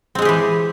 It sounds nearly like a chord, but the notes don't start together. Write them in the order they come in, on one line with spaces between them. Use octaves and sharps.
C4 G#3 G#4 G4 E3